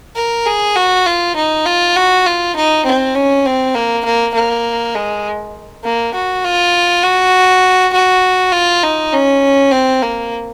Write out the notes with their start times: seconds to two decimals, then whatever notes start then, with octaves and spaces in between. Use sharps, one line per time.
0.16 A#4
0.46 G#4
0.76 F#4
1.06 F4
1.36 D#4
1.66 F4
1.96 F#4
2.26 F4
2.56 D#4
2.86 C4
3.15 C#4
3.46 C4
3.75 A#3
4.05 A#3
4.34 A#3
4.95 G#3
5.84 A#3
6.14 F#4
6.44 F4
7.03 F#4
7.93 F#4
8.52 F4
8.83 D#4
9.13 C#4
9.72 C4
10.03 A#3